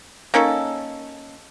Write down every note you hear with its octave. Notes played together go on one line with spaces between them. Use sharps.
A#3 C#4 D#4 A4